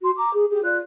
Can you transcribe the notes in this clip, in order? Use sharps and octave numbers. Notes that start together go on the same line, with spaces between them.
F#4 C6
A#5 D6
G#4
G4 G#4
F4 D5 F#6